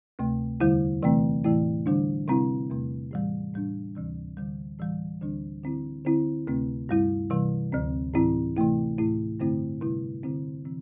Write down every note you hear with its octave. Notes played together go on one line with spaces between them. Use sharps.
D2 C3 A3
E2 D3 G3 E4
C3 E3 A3 C4
A2 E3 A3 E4
D3 G3 D4
C3 G3 C4 E4
E2 C3 A3
A2 E3 G3
A2 G3 D4
D2 C3 E3 G3
D2 D3 G3
A2 E3 G3
D2 D3 G3 D4
D3 C4 E4
D3 C4 E4
D2 C3 A3 C4
G2 G3 E4
C3 E3 G3
D2 D3 C4
A2 E3 C4 E4
C3 E3 A3 E4
A2 A3 E4
G2 D3 A3 C4 E4
C3 G3 E4
D3 C4 E4
C3 E3 C4